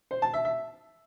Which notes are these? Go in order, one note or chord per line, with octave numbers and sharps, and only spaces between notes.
C5
A5
E5
E5